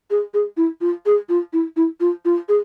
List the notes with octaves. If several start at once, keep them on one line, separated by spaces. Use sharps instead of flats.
G#4
G#4
E4
F4
G#4
F4
E4
E4
F4
F4
G#4